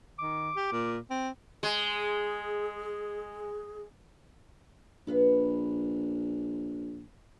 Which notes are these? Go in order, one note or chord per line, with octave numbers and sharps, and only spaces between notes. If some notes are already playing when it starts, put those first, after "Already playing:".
D#3 D6
G4
A#2
C4
G#3 G#4
A#1 B3 B4 F5